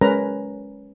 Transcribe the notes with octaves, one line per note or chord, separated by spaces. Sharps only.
G#3 C#4 A#4 B4 A#5